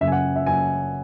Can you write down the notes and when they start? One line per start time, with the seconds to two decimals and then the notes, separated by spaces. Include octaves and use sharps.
0.01 F#1 F#2 C#3 E5
0.07 G#5
0.12 F#5
0.36 E5
0.46 F#1 F#2 C#3 G#5